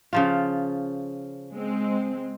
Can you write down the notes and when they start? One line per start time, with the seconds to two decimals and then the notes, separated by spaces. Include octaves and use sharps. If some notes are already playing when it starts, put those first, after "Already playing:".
0.13 C#3 F3 F4
1.52 G#3 C4